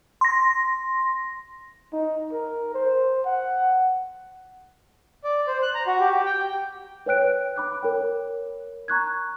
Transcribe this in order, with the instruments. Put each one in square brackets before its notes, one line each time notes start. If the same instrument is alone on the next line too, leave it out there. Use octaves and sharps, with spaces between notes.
[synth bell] C6 A#6
[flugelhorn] D#4
A#4
C5
F#5
[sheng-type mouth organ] D5
C5
F#6
A#5
F#4
G4
G4
G5
[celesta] B4 C#5 G5 F#6 D7
B5 D6 F#6
A#4 C#5 G5
A#5 C#6 F#6 G#6